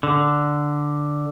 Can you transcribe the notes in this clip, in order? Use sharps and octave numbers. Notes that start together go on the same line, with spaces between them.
D3